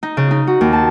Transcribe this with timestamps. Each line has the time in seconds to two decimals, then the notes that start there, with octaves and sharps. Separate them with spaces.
0.03 D#4
0.17 C#3
0.31 D#4
0.47 F#4
0.61 D#2
0.73 A5